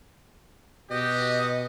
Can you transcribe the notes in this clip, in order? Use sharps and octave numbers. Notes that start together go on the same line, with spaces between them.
B2 F#4 G4 D#5